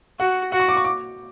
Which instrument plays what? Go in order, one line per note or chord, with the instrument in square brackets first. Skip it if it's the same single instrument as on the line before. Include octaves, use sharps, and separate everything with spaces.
[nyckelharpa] F#4 [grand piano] F#5
[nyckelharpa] F#4 [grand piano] F#5
[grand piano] C#6
D6
C#6
D6